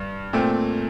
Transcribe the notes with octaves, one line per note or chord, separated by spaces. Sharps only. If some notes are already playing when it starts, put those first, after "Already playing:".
Already playing: G2
A#2 A3 C4